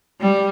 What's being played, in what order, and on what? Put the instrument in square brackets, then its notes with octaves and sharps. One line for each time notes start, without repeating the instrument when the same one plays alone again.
[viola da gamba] G3